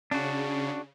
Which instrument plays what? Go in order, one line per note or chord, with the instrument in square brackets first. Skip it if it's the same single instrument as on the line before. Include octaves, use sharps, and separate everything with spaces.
[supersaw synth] C#3 [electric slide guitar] D4 F#4